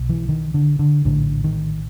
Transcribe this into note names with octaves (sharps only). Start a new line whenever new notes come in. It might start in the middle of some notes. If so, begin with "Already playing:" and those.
Already playing: B1 B2
E3
D#3
D3
D3
A#1 A2 D3
D#3